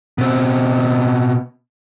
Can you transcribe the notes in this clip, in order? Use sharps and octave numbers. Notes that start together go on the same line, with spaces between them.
B2 C4